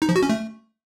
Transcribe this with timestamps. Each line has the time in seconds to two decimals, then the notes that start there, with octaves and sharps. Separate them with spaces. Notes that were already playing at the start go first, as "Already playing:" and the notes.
0.02 D#4
0.09 F3
0.16 F#4
0.23 C#4
0.29 A3